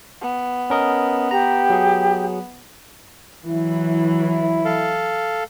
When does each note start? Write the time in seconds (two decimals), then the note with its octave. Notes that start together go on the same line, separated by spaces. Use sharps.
0.21 B3
0.70 C#4 A#4 D#5
1.31 G4 A#5
1.70 F#3 G#4
3.47 E3 F#3 E4
4.65 A4 F5